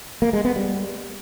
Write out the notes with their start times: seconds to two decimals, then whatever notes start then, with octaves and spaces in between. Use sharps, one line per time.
0.22 A#3
0.33 G#3
0.45 B3
0.56 G3